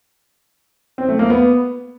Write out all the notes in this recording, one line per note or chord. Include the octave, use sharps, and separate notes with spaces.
C4
A3
A#3
B3